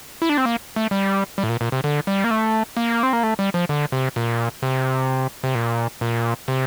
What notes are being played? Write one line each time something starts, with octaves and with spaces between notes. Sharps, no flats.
E4
D4
C4
A#3
A3
G3
G3
A2
A#2
A#2
C3
D3
G3
A#3
A3
A#3
C4
A#3
A3
G3
F3
D3
C3
A#2
C3
C3
A#2
A#2
C3